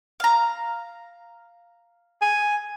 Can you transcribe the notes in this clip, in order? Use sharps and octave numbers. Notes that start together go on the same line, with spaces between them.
F5 A#5
G#5